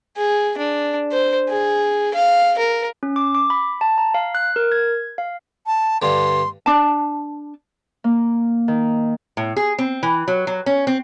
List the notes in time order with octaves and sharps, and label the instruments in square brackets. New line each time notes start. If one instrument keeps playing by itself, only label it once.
[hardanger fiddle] G#4
D4
C5
G#4
F5
A#4
[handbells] C#4
D6
D6
B5
A5
A#5
F5
F#6
A#4
G#6
F5
[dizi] A5
[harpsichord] G2 D3 [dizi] C6
[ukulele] D4 A5
[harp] A#3
D#3
[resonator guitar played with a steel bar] A2
G#4
C4
E3
F#3
F#3
C#4
C4